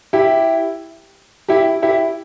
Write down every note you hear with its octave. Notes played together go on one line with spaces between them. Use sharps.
E4 G4
E4 G4
E4 G4